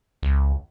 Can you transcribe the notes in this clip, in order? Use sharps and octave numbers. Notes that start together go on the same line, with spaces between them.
C#2